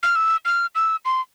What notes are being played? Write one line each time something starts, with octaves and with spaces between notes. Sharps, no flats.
F6
E6
F6
E6
C6